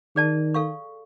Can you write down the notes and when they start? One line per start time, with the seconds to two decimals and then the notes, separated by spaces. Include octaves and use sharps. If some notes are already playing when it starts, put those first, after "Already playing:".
0.16 D#3 G#4 D5 A5
0.54 A4 F5 C#6